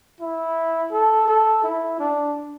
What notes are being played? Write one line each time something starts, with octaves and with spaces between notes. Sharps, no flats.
E4
A4
A4
E4
D4